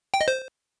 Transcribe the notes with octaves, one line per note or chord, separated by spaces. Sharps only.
G5
D#5
C5